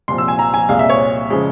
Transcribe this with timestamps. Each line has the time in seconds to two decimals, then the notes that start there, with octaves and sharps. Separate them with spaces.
0.08 C2 A#2 F3 C6
0.18 E6
0.28 G#5
0.39 A#5
0.54 G#5
0.69 C2 A#2 G#3 F5
0.79 E5
0.89 C#5
1.30 C#3 F3 G#3